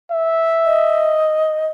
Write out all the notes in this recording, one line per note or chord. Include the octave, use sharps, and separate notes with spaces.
E5
D#5